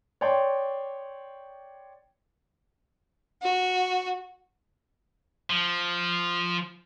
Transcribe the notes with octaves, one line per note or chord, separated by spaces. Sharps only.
C#5 D5 G5 C6
F#4
F3